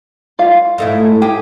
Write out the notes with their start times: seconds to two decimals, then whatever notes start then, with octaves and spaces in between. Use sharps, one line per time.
0.39 F4 F5
0.78 G#2 A3 E4
1.22 G4 G#4